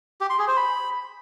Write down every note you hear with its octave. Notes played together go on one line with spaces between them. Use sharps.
G4
C6
G#4
C5
B5